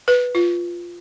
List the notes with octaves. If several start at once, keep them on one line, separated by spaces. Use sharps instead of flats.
B4
F4